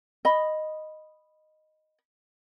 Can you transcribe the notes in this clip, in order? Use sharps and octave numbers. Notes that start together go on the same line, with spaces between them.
D#5 B5